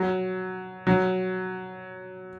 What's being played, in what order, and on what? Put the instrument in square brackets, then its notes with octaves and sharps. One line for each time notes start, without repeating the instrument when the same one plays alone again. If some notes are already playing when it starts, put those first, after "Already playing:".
Already playing: [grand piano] F#3
F#3